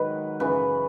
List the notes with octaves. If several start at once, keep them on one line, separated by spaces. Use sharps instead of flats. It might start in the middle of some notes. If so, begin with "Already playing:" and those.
Already playing: G#2 D#3 F#3 B4
F#2 C#3 E3 B4